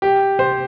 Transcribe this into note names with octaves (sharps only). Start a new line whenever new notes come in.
G4
C5